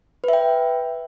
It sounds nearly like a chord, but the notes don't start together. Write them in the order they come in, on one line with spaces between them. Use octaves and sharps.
B4 E5 G5